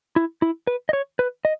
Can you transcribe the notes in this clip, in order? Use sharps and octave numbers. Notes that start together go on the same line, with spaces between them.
E4
E4
B4
D#5
C#5
B4
D#5